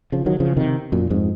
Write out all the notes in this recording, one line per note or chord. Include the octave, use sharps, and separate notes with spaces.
C#3 F3
D#3 F#3
C#3 F3
C3 D#3
F#2 A#2
F2 G#2